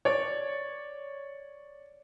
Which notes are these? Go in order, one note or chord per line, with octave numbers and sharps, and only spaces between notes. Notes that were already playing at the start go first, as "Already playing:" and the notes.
C#5 D5